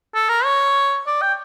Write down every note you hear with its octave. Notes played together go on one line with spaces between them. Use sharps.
A4
A#4
C#5
D5
G5